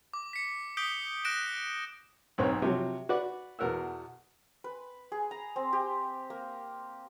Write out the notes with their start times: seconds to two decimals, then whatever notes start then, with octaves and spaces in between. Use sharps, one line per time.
0.13 D6
0.33 B6 C#7
0.77 D6 D#6 G6 B6 D7 G7
1.25 F#6 A#6 D7 E7
2.38 B1 G#2 C4 C#5
2.62 C3 F3 F#3
3.09 F#4 B4 D5 F#5
3.59 E2 B2 A#4 F#5 E6
4.64 B4
5.12 G#4
5.31 A#5
5.56 C4
5.73 G4
6.30 A#3